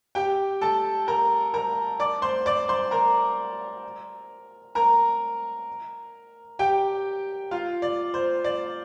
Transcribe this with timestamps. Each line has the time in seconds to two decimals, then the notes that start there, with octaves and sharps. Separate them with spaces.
0.15 G4 G5
0.61 A4 A5
1.08 A#4 A#5
1.54 A#4 A#5
2.00 D5 D6
2.22 C5 C6
2.46 D5 D6
2.68 C5 C6
2.91 A#4 A#5
4.75 A#4 A#5
6.59 G4 G5
7.51 F4 F5
7.82 D5
8.14 C5
8.44 D5